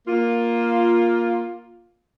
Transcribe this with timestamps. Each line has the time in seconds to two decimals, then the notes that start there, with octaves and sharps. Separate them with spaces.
0.08 A#3 F4